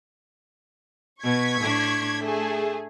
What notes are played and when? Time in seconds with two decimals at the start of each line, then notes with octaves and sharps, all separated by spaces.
1.23 B2 C#6 G#6 B6
1.61 A2 D4
2.20 A3 G#4 A4